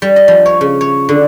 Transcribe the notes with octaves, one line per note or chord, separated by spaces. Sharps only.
G3
D#5
F3
C#5
C#3
C#5
D3